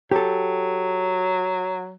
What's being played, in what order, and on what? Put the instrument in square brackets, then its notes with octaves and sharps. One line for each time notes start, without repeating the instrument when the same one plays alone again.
[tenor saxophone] F#3 [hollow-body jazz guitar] G4 A4